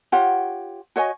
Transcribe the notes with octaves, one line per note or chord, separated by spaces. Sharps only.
F4 G4 C#5 F#5
F#4 C#5 D#5 G#5